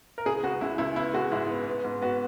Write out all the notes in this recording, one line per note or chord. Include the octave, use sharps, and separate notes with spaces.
A#4
C#2 G#4
C#2 F#4
C#2 E4
C#2 E4
B3 E4
G#3 F#4
G#2 E4
B3
B3
G#2
B3 F#4